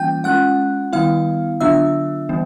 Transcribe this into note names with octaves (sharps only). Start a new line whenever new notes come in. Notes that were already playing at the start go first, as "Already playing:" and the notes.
Already playing: E3 G3 A#3 C#4 F4 G5 G6
G#3 C#4 F4 F#5 F#6
D#3 G3 B3 E4 F5 F6
D3 F#3 B3 D4 F4 E5 E6
E3 G3 B3